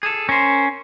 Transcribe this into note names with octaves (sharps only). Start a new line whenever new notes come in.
G#4 A4
C#4 A#4 C5